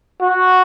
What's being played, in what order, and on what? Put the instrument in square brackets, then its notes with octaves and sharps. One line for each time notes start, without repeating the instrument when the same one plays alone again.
[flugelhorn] F#4